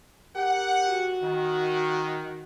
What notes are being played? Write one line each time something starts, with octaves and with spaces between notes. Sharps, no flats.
G4 A#4 F#5
F#4
D#3